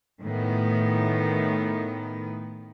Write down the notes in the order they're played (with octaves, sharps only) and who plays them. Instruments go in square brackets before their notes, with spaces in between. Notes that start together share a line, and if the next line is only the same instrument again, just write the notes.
[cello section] A2 D#3 B3